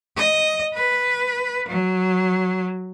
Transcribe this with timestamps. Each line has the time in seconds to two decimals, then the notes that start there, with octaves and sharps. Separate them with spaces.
0.17 D#5
0.74 B4
1.68 F#3